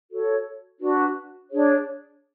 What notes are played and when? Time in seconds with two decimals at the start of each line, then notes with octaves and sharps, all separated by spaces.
0.11 F#4 A4 C#5
0.80 D4 F#4 B4
1.50 D4 G#4 C#5